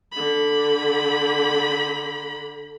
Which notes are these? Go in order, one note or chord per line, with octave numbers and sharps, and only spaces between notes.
D3 B5